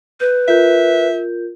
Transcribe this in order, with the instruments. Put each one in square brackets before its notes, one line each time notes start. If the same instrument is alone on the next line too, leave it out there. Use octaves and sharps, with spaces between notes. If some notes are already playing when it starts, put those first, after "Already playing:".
[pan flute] B4 [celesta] G6
[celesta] F4 A#4 G6 [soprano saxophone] E5